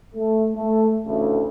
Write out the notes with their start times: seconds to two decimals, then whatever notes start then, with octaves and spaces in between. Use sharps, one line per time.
0.15 A3
0.56 A3
1.06 A1 D2 C#3 A3